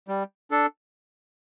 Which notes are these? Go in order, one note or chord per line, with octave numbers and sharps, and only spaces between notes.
G3
D4 A4